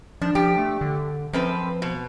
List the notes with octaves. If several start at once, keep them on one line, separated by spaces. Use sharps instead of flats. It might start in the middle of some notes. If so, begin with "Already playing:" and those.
F3 D4
F3 G4
A3
D3
F#2 F3 C4 B4
B2